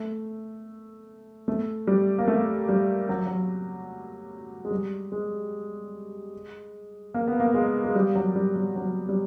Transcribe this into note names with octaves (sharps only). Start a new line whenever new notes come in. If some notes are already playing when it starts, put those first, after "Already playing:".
Already playing: A3
A3
G3
A#3
A3
G3
F#3
F#3
G#3
G3
G#3
A#3
B3
A#3
G#3
G#3
G3
F#3
G3
G3
F#3
G3